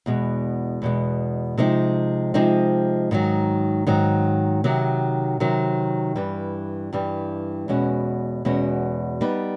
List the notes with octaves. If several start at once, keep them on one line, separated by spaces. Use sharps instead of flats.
E2 B2 G#3
E2 B2 G#3
C3 F3 G#3 C4 D#4
C3 F3 G#3 C4 D#4
G#2 D#3 F#3
G#2 D#3 F#3
C3 D#3 F#3
C3 D#3 F#3
G2 E3 G3
G2 E3 G3
E2 B2 G#3 C#4 F#4
E2 B2 G#3 C#4 F#4
G3 B3 D#4